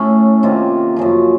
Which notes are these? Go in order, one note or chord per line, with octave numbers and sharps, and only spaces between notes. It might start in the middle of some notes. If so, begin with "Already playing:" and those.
Already playing: A2 A3 C#4
C3 D#3 A#3 F4
F#2 C#3 F3